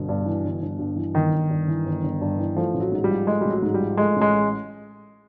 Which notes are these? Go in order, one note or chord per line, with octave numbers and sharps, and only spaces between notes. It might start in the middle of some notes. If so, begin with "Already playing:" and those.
Already playing: G1 B2
G2
E3
G1
G1
G2
E3
G1 D#3
G1
G2
E3
G1
G1
G2
E3
F3 A3
A1
F#3
G#2
G3
F3
G#3 A3
A1 G3
F#3
G#2
G3
F3
G#3 A3
A1
G#3